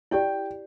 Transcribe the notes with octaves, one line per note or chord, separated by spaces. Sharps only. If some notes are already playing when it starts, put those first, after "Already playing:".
E4 G4 D5 G5